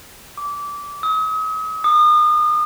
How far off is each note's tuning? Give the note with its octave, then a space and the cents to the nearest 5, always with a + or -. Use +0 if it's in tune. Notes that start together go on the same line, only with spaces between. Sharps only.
D6 -20
D#6 +40
D#6 -35